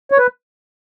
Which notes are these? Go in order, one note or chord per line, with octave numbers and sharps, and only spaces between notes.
C#5
B4